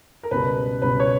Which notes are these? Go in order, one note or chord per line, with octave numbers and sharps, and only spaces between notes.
A#4
C#2 B2 G3 B4
C#2 B2 G3 B4
C#5